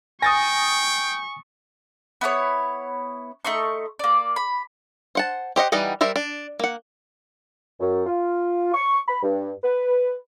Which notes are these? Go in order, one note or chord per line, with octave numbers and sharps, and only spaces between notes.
G5 G#5 C#6 D#6 A6 A#6
B3 E4 B4 C#5
A3 D#4 C6 C#6
A#3 D5
B5
C5 F#5 A5
G4 C5 D#5 F#5
E3 G3 D#4 D#5 F#5
G3 A#4 C5 E5
D4
A#3 F#5
F#2
F4
C#6
B5
G2
B4